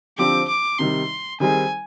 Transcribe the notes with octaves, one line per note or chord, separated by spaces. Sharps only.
D3 F3 C4 G4 D6
D6
C3 D#3 G3 C6
D#3 G3 C4 D#4 G#4 G#5